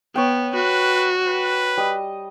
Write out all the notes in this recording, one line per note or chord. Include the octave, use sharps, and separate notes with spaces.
B3 C#5 G5
F#4 B4
B4
G3 D#5